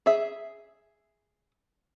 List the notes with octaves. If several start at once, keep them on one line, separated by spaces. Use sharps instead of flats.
G#4 E5